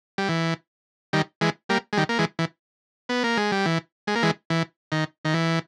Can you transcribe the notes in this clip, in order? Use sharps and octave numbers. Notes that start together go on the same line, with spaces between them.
G3
E3
D#3 G3
E3 G#3
G3 A#3
G#3
D#3 G3
A#3
E3 G#3
E3
B3
A#3
G#3
G3
E3
G#3
A#3
E3 G#3
E3
D#3
D#3
E3